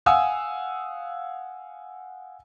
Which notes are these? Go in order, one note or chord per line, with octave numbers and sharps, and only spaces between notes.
F5 F#5 G#5 D#6 E6